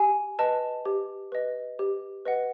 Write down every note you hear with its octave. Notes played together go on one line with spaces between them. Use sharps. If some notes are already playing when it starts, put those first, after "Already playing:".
Already playing: G4 G#5
B4 D#5 A5
G4
B4 D#5
G4
B4 D#5 F#5